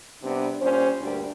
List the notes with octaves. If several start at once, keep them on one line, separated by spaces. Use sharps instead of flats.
C3 G3 B3 D4
A#2 G3 C#4 C5
D2 G2 A#2 G3 D4